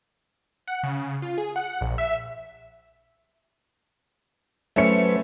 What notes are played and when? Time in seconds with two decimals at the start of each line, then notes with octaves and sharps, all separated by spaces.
0.68 F#5
0.83 C#3
1.22 F4
1.38 G#4
1.56 F#5
1.81 A#1
1.98 E5
4.76 F#3 A3 C#4 B4 C5 C#7